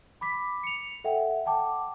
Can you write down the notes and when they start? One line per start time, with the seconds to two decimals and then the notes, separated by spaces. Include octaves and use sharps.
0.21 B5 D6 B6
0.63 C#7 F7
1.04 A4 E5 F#5 G5
1.45 F#5 G5 A5 D6